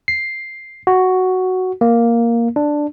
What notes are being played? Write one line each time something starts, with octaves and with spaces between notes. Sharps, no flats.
C7
F#4
A#3
D4